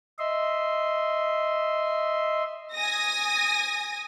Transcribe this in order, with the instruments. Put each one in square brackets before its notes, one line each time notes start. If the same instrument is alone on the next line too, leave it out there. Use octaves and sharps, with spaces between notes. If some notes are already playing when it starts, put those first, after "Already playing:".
[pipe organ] D#5 E5 C6
[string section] G#5 D#6 A#6